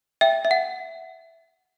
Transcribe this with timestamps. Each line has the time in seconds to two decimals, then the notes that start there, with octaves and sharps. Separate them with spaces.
0.21 E5 G5
0.45 E5
0.51 F#5